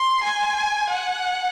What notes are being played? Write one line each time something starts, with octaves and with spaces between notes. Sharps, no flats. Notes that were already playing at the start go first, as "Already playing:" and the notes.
Already playing: C6
G#5
F#5